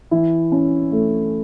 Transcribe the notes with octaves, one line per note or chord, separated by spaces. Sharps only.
E3 E4
C#4
A3